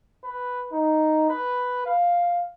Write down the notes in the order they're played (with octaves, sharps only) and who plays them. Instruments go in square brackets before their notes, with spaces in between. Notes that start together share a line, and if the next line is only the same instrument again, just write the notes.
[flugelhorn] B4
D#4
B4
F5